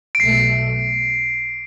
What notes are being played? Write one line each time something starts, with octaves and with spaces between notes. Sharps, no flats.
D7
B1 B2 A3 C7